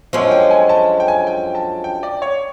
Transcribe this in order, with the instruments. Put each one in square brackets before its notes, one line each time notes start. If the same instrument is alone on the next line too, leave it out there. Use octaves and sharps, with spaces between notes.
[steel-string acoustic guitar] F#2 D3 F3 G#3 C#4
[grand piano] G5
G#5
A5
G5
G#5
G5
A5
G5
D5
C#5